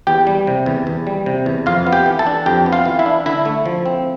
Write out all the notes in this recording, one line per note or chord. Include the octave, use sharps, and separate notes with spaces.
E2 G4 G5
G3
C3
E2
E2
G3
C3
E2
F2 F4 F5
B3
G4 G5
E3
A4 A5
D4
F2 G4 G5
B3
F4 F5
E3
E4 E5
D4
D3 E4 E5
A3
F3
C4